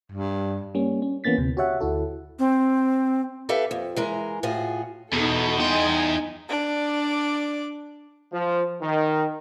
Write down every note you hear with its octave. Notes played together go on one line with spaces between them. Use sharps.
G2
G3 A#3 C#4
C#4
E3 A#3 B3 C#4 A6 B6
D2 C3
F#4 G4 C#5 E5 F#5
D2 E4 F#4 A4
C4
G4 A4 B4 E5 F5
F2
E3 G#3 A#4
A2 F4 F#4 G#4
E2 B2 D#4 A4
D#4 D#5 G5 G#5 C6
D4 D5
F3
D#3